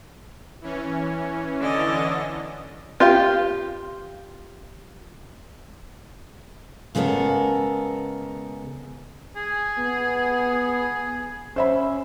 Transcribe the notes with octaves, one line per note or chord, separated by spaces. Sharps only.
E3 C#4
D3 D#5
F4 G4 F5
C#3 G#3 B3 A4 A#4
G#4
B3
C#4 C5 E5 B5